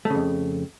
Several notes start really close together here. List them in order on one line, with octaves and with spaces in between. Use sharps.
A3 C#3 F2